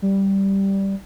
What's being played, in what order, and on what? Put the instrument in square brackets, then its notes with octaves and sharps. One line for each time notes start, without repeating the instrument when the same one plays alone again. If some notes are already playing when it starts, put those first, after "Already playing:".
[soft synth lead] G3